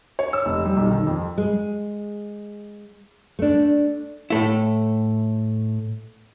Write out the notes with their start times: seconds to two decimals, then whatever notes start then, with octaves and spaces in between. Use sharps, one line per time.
0.19 C#5
0.33 E6
0.46 F1
0.65 G3
0.77 B1
0.90 D#3
1.07 F2
1.38 G#3
3.39 A3 D4
4.30 A2 A3 E4